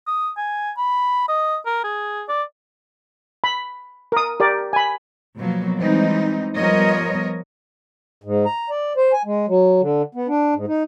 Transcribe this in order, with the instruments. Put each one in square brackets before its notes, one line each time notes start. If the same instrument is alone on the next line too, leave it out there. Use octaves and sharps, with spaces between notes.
[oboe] D#6
G#5
B5
D#5
A#4
G#4
D5
[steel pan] B5
A#4 D#6
G4 A#4 D5
G#5 B5
[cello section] B2 F3 F#3 A#3
E3 G3 G#3 C4 D#4
F3 G3 B3 A#4 C#5 D#5
[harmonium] G#2
A#5
D5
C5
G#5
G#3
F#3
D3
B3
D4
G#2
D#4